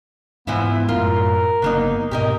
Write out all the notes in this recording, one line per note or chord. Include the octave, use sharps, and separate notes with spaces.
G#2 E3 F3 B3 E4
F#2 A2 F4 A#4 F5
G1 C#3 F#3 A#3 B3 D#4
G#2 B2 G4 A#4 D#5